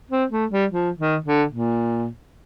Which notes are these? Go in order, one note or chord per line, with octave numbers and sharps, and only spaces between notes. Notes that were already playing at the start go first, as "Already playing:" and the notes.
C4
A3
G3
F3
D#3
D3
A#2